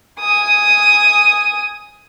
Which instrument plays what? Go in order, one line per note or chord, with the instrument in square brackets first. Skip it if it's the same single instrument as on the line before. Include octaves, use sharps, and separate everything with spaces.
[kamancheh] G#5 D#6